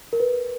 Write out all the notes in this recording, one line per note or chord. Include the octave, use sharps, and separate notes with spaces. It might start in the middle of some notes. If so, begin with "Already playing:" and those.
A#4
B4